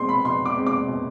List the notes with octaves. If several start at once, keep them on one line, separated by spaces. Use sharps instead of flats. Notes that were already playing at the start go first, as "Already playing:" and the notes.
Already playing: B2 G#3 C4 C6
B5
B2 C6
D6
G#3 C4
D6
B2